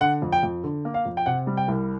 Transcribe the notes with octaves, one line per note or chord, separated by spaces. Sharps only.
D3 F#5
F2
G5
F2
D3
A#3
F5
F2
G5
C3 F#5
G3
G5
C2